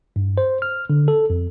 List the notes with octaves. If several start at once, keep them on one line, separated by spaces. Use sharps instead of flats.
G2
C5
F6
D3
A4
F2